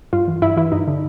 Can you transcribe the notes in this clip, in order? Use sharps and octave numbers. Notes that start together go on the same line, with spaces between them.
G2 F4
E3
G2 E4
E3 E4
G2 D#4
D3